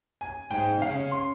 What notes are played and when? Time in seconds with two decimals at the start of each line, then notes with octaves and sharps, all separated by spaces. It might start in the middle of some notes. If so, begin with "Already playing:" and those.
0.21 G#5
0.51 G#2 G#3 G5
0.81 C#3 C#4 F5
1.11 C6